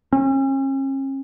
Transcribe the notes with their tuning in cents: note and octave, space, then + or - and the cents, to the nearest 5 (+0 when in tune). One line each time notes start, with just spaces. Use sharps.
C#4 -40